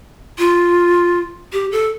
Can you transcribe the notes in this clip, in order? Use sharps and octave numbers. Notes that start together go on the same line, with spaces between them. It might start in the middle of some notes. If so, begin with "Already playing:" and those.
F4
G4
A4